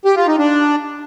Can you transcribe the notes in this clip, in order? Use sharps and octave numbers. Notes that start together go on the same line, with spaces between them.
G4
F4
D#4
D4